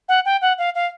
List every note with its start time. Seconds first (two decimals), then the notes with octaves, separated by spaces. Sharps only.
0.08 F#5
0.25 G5
0.41 F#5
0.58 F5
0.75 F5